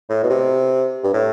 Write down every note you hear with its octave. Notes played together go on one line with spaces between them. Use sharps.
A2
B2
C3
G2
A2